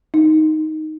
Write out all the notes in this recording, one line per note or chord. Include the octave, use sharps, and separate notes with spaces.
D#4